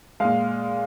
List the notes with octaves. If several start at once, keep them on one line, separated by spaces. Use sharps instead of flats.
A#2 G#3 F5